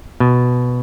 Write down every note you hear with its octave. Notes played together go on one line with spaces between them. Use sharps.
B2